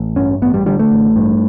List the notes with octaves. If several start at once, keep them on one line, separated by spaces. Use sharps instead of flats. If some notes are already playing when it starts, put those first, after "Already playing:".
Already playing: A1
G2 C#4
A1 B3
G3
D3 G3
A3
A1
G2